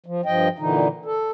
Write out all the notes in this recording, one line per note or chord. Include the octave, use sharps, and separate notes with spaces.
F3
G2 F3 D#5 G5
A#2 D3 E3 D#4
A4